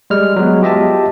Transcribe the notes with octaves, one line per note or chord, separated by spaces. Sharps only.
G3 G#3 F6
F#3 G#3 B3
F4 G4 D#5 E5 A5